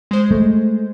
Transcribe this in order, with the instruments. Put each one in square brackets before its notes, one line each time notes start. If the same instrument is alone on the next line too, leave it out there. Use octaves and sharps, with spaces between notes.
[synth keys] G#3 C5
[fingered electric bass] A3